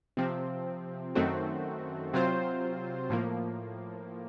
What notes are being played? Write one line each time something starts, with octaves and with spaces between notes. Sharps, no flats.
C3 F3 C4
F#2 D#3 A3 C4 F#4
C3 F#3 C4 F4 C5
A2 F3 A#3